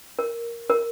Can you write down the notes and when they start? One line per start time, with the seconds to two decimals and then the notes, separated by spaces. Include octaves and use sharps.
0.19 A#4
0.70 A#4